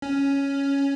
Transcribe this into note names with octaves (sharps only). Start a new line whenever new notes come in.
C#4